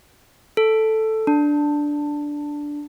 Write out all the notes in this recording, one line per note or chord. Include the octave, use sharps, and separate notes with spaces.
A4
D4